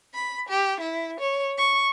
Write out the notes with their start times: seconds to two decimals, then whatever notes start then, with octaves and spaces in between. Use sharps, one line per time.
0.14 B5
0.48 G4
0.80 E4
1.20 C#5
1.58 C#6